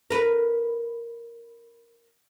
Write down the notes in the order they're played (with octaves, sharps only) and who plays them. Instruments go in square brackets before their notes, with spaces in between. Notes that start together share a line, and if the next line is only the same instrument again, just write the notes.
[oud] A#4 B4